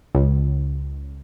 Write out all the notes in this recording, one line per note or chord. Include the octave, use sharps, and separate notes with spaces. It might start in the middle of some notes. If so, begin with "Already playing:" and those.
C#2